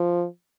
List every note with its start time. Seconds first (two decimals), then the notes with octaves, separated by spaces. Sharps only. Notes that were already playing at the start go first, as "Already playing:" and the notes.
Already playing: F3